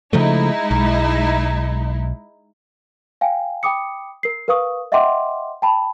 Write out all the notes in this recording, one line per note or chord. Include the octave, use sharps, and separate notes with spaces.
C#3 F3 G#3 A3 D#4 E4
B1
F5 G5 G#5
G5 B5 D6 D#6 C#7
A#4 C7
A#4 B4 F5 C#6 D#6
D#5 E5 F#5 G5 C6 D6
G5 A5 B5